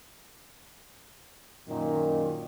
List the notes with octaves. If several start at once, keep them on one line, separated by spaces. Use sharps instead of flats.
F#2 A#2 D#3